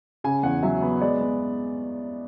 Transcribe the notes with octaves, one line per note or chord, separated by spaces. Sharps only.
C#3 G#5
E2 F#5
F#3 E5
B3
G#3 D5
B3